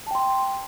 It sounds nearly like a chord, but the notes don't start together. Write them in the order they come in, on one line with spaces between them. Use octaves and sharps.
A5 G5 C6